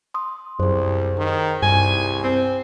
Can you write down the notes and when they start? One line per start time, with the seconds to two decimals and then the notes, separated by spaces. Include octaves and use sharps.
0.14 C6 D#6
0.60 C2 F#2 G#4 C5
1.17 D#3
1.63 C2 G2 G#5
2.23 C4